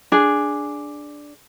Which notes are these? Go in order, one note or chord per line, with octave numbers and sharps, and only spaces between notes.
D4 G#4